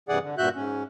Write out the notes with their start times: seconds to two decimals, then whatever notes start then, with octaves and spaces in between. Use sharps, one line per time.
0.09 G2 C3 E3 G#4 D5 F#5
0.22 D3
0.38 G2 A#2 F#4 E5 F#6 G6
0.56 G#2 C#4